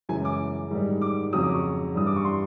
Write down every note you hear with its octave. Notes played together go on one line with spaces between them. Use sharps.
F#2 C#3 E3 G#3 G#5
D6
G#2 D#3 G3
D6
F2 C#3 F#3 D#6
D6
C#6
G2 E3 G3 D#6
D6
C#6
C6